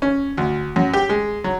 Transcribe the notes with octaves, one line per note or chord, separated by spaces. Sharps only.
C#4
D2
F#2
G4
G#3
F#3